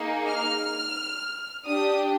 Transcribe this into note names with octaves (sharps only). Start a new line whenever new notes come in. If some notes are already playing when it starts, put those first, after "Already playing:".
Already playing: A#3 D#4 G#4
F6
D4 G4 D#6